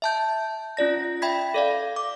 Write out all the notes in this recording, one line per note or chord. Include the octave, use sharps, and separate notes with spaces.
E5 A5 G6
C#4 F4 D5 A#6
E5 G5 B5 G#6 B6
A4 D5 F5
D6